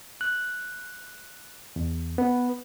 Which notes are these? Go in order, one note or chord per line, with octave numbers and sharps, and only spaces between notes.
F#6
E2
B3